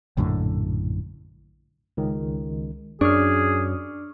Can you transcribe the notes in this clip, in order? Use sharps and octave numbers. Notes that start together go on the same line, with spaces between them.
A#1 F#2 A2 D3
C#2 D#3
F#2 D4 G#4 C#6 F6